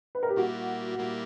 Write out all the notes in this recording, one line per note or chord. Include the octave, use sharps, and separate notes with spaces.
B4
A#4
G4
A#2 G3 A#3 E4 F#4
A#2 G3 A#3 E4